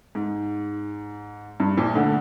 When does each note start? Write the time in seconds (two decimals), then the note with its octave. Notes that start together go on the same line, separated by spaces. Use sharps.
0.15 G#2
1.60 G2
1.77 A#1 A#2
1.95 D2 D3